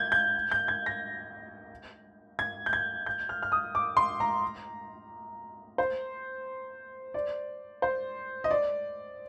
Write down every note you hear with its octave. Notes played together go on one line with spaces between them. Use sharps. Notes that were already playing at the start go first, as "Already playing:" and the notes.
Already playing: G6 G#6
G6
G6
G#6
A#6
G#6
G6
G#6
G6
F6
F6
D#6
D6
C6
A#5
C5
D5
C5
D#5
D5